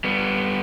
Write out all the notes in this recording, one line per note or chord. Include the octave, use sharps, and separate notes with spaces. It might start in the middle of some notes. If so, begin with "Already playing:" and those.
G3 B3